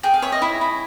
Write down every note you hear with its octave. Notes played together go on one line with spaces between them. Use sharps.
G#4 G5
F5
C#5 E5
D#5
E4
E4